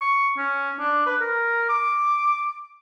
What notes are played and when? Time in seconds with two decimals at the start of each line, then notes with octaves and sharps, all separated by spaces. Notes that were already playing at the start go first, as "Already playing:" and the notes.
0.01 C#6
0.37 C#4
0.79 D4
1.07 B4
1.21 A#4
1.69 D6